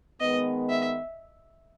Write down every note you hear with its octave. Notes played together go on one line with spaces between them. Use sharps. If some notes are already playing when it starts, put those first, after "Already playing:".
D#3 G#3 B3 D#5
E5